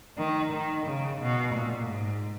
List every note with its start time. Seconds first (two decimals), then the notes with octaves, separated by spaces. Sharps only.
0.18 D#3
0.52 D#3
0.87 C#3
1.21 B2
1.54 A#2
1.88 G#2